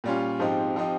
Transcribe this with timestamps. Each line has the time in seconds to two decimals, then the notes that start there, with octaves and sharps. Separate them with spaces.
0.04 A#2 G3 C#4 F4
0.39 G#2 F3 C4 D#4 G4
0.76 F3 C4 D#4 G4